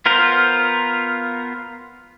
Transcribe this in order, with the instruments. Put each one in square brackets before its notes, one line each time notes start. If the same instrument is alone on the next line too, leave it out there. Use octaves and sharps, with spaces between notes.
[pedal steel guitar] B3 F4 A#4 C5